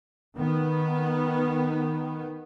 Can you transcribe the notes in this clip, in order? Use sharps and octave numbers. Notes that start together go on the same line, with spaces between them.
D#3 B3